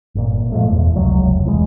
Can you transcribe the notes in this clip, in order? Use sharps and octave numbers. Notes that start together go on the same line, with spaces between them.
G1 A#2
A#2 F3 G#3 A3
E2
F1 C#2 C3 F#3
E1 E3 G#3